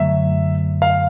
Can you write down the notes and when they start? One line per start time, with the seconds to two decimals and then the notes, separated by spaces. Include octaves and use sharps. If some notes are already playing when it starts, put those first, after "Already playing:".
Already playing: F#2 D3 F#3 A3 E5
0.82 F5